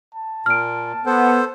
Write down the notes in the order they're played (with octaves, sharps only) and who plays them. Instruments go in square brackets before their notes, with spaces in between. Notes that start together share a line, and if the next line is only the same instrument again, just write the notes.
[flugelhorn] A5
[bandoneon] A#2 [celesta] F6 D7
[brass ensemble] B3 [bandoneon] A4 C5